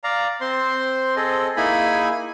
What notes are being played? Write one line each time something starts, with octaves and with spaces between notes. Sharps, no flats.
D5 F5 A#5
C4 C5 C6
C4 G#4 A4 D#5
A#3 D#4 E4 G#4 G#5 B5